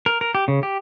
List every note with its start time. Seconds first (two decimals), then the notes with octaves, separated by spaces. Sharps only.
0.06 A#4
0.21 A#4
0.35 G4
0.48 C#3
0.63 G4